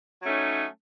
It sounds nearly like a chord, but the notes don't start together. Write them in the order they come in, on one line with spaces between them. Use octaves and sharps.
F#3 C#4 A3 D#4